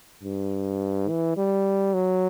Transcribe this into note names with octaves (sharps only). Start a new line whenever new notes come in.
G2
E3
G3
F#3